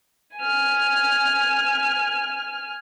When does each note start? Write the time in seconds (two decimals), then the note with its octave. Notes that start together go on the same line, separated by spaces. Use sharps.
0.37 G#5 F6